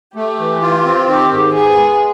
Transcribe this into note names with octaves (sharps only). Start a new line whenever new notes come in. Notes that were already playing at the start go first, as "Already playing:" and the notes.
A3 G4
E3
F4
C4
D#3 G4
G#2
B3 G#4
G#3